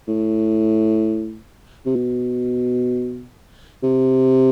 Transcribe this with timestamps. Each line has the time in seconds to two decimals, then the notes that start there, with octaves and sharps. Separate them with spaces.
0.08 A2
1.86 C3
1.95 B2
3.83 C3